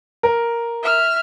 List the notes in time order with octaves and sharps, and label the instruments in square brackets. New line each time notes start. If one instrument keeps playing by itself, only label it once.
[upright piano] A#4
[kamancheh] E5 F6